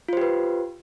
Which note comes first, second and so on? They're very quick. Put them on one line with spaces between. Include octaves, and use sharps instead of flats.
F4 C5 G4 B4